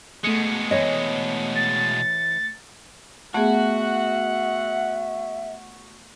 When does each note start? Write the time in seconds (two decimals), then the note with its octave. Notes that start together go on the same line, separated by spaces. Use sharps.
0.24 B2 G#3 A3 C#7
0.71 E3 C#5 D#5
1.55 A6
3.34 A3 B3 F#4 G#4 E5 F#5